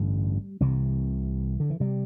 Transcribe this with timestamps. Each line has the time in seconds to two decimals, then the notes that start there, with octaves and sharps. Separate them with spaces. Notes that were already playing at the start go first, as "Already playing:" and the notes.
Already playing: A1 G2 D3 G3
0.60 C2 C3 E3
1.60 D3
1.70 E3
1.80 C3 G3